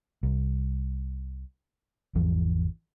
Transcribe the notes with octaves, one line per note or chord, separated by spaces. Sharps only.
C2
G#1 E2 E3 F3